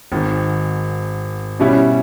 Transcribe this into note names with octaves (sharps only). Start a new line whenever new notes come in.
G#1 G#2 D#3
B2 G3 C#4 E4